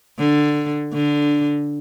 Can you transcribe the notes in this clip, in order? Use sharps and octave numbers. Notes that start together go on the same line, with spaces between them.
D3
D3